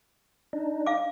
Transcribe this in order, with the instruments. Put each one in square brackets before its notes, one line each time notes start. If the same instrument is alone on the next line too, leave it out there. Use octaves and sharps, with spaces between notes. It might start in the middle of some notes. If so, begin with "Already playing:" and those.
[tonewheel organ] D4 D#4
[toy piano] F5 D6